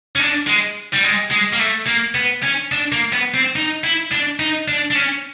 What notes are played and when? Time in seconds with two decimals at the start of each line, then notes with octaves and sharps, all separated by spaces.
0.16 C#4
0.19 D4
0.47 G#3
0.93 G3
1.04 G#3
1.31 G#3
1.53 A#3
1.60 A3
1.87 A#3
2.15 B3
2.43 C#4
2.72 D4
2.92 A#3
3.13 B3
3.34 C4
3.56 D#4
3.84 E4
4.11 D4
4.39 D#4
4.68 D4
4.91 D4
4.95 C#4